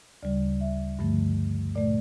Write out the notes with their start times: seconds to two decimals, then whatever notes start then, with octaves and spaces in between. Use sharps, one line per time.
0.23 D2 C#3 G3 D5
0.61 E5
0.99 G2 D3 F3 A3
1.75 A#2 A3 D5